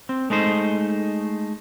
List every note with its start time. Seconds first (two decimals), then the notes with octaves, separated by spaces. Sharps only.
0.09 C4
0.30 G#3 A3 D#4 C5